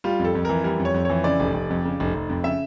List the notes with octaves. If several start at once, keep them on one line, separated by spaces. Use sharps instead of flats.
G3 F4
F2
A4
F2
E3 A#4
G3 A#4
F2
C#5
F2
E3 C#5
C#3 D5
F1
F1
F2
C#3
F1
F1
F2
C#3 E5